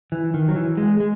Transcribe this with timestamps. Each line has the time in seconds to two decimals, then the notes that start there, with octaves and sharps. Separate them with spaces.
0.12 E3
0.34 D#3
0.49 F#3
0.56 E3
0.77 G#3
1.00 G#3